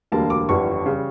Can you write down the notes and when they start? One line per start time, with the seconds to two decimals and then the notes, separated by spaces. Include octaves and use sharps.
0.12 E1 D2 D3 G3 A#3 A5
0.30 D6
0.49 G1 F2 E3 G3 C#6
0.86 C#3 G3